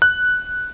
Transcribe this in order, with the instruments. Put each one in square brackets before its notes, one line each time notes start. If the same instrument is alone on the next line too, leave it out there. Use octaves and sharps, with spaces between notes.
[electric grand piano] F#6